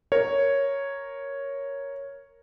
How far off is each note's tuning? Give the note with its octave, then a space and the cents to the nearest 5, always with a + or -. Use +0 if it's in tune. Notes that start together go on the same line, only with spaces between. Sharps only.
A#4 +0 C#5 +0